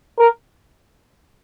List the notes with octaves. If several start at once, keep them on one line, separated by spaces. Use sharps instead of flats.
A#4